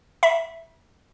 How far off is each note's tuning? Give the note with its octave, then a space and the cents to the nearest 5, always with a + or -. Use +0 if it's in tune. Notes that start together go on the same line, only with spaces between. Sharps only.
E5 +0 B5 -45